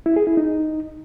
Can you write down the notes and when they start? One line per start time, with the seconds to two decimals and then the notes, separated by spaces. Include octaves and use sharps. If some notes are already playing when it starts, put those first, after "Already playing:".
0.06 E4
0.16 G#4
0.27 E4
0.37 D#4